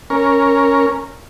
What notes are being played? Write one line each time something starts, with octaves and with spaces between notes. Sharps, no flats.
C#4 A#4